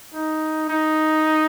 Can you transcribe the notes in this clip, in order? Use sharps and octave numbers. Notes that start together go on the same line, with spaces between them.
D#4
D#4